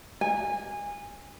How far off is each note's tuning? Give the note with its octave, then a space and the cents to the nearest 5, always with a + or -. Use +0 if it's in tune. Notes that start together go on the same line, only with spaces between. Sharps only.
G#5 -20